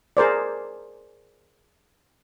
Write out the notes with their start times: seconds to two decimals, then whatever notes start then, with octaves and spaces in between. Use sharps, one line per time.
0.17 G#4 A#4 C5 D5